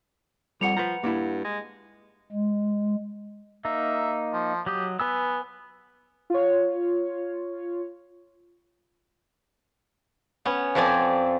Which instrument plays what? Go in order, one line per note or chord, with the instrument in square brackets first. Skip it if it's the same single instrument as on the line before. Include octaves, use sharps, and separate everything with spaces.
[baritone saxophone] F2 [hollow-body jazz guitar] G3 [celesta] F#5 C#7 F7
[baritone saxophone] F3 [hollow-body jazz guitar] B4 A#5
[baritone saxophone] G2 [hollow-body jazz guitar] A#3 E4
[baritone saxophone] G#3
[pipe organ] G#3
[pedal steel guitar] A#3 D#4 [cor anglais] E5
[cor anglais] F3
[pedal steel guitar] F#3 D#6 [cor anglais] G4
[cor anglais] B3 [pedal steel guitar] B4 G#5 E6
[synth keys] F4 C#5
[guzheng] B3 C#4
F2 F3 C4 D5 G#5